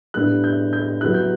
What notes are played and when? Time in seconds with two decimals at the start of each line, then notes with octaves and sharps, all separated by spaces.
0.14 A2 G3 B3 D4 F#6
0.44 G6
0.73 G6
1.01 F#3 B3 E4 F#6
1.14 G6